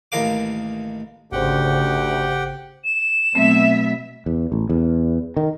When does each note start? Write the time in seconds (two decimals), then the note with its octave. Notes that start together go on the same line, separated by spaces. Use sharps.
0.12 A1 D#2 A#4 F5 D6
1.32 G#1 D2 C#3 G4 C5 F#5 G5
2.84 E7
3.35 B2 F#3 A3 C4 E5
4.26 E2
4.52 A1
4.69 E2
5.37 D#3